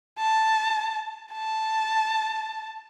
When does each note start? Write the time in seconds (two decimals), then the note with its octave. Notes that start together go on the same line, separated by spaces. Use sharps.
0.19 A5
1.32 A5